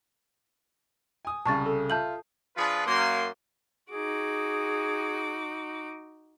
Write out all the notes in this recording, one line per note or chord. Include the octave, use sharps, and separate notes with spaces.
G#5 D#6
C2 C#3 A5 C#6 A6
A4
F4 E5 A5 G6 F#7
F3 D4 F4 G#4 B4
F#2 A#3 C6
D#4 F#4 G#4 D6